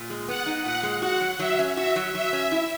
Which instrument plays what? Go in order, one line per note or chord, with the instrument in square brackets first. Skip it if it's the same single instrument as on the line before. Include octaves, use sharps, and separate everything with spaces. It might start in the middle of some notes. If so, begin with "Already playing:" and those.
Already playing: [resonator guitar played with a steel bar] A#2
G#3
[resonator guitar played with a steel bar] B3 [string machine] F#5
[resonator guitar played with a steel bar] D#4
[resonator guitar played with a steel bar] A#2 [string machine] F#5
[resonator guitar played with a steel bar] G#3
[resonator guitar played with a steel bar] F#4 [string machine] F#5
[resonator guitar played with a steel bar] F#3
[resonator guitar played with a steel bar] F#3 [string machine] E5
[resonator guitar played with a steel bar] C#4
[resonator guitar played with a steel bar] F#4 [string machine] E5
[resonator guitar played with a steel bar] F#3
[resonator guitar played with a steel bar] F#3 [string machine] E5
[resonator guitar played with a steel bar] C#4
E4